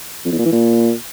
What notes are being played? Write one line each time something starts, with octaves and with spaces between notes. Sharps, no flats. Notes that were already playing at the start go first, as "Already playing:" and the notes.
F2
E2
A#2
E3
A#2